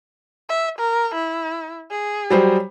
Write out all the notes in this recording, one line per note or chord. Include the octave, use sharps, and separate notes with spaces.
E5
A#4
E4
G#4
F#3 G3 C5